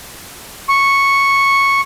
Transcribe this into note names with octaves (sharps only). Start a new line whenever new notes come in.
C#6